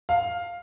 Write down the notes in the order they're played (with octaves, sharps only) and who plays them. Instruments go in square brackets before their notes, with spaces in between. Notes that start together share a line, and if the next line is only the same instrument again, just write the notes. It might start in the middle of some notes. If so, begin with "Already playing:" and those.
[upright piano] F5